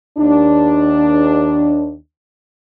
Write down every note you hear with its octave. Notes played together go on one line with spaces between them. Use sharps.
D#2 D4